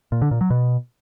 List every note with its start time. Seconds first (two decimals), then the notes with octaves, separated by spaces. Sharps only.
0.12 A#2
0.22 D3
0.31 A#2
0.41 F#3
0.50 B2